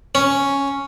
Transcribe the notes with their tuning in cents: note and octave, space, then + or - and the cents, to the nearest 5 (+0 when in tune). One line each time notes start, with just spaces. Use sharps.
C#4 +0